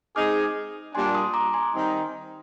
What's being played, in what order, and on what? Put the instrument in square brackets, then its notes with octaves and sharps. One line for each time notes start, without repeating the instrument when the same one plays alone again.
[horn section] G#3 C4 D#4 G#4 [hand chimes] D6 F6
[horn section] A#2 G3 D4 [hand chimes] G#5 C6
[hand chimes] C6 D#6
A#5 D6
G#5 C6
[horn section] D#3 G3 C4 D#4